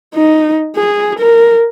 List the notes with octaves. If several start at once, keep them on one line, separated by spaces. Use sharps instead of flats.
D#4
G#4
A#4